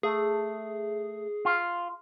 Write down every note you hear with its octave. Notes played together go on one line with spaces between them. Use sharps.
A3 G#4
F4